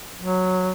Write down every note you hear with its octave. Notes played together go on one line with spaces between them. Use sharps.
F#3